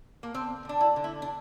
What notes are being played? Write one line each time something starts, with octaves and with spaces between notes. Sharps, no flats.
A#3
D3 C4
D3 D4
E4
D3
E4
D4